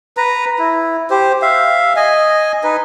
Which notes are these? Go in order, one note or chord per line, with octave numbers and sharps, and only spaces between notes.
B4 A#5
E4
G4 C5
E5 F5
D#5 G#5
D#4 B4